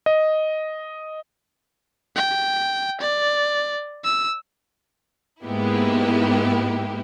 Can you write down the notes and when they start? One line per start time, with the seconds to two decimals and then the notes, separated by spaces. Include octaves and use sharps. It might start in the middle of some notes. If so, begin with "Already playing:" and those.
0.06 D#5
2.16 G5
3.01 D5
4.04 E6
5.43 G#2 G#3 A#3 B3 E4 G4